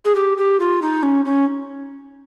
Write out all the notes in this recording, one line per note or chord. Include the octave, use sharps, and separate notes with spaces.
G#4
G4
G4
F4
D#4
C#4
C#4